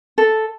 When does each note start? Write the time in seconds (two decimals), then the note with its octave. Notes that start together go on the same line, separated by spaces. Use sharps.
0.18 A4